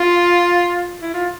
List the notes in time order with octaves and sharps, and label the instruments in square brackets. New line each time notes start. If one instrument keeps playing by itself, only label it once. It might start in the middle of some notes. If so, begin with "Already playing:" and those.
Already playing: [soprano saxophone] F4
E4
F4